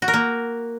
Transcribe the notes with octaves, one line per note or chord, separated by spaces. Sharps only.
F#4
A#4
A#3